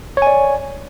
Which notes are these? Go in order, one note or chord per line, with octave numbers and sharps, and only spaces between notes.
C#5 D5 G#5